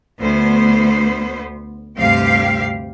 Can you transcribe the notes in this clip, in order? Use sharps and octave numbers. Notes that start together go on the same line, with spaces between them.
D2 B3 C5
D2 G2 C3 G4 F5